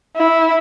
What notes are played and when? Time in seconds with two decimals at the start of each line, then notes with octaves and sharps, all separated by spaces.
0.16 E4